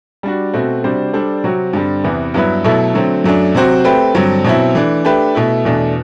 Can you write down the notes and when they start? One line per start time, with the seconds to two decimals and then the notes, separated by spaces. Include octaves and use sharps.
0.23 G3 D4 F#4
0.53 B2 A3 C4 F#4
0.84 C3 G3 D4 F#4 C5
1.13 G3 D4 A4 C5
1.44 C3 F#3 C4 F#4
1.73 G2 D3 G3 C4
2.04 E2 C3 E3 B3
2.34 G2 F#3 B3 E4 B4
2.64 B2 F#3 A3 E4 A4
2.94 D3 F#3 A3 C4
3.24 F#2 F#3 A3 D4
3.55 C3 F#3 C4 F#4 C5
3.85 A3 C4 G4 B4
4.15 G2 D3 F#3 C4
4.44 B2 F#3 C4 E4
4.75 E3 A3 D4
5.05 A3 D4 G4 B4
5.35 B2 A3 E4
5.65 E2 B2 A3 D4